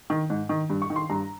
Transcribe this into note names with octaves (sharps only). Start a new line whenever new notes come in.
D#3
G#2
D#3
G2
C#6
D#3
C6
G2 A#5